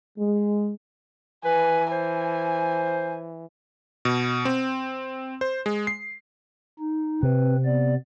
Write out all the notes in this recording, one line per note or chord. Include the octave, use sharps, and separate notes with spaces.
G#3
E3 B4 G#5
C5 G#5
B2
C4
C5
G#3
C7
D#4
C3 C4 B4
B3 D5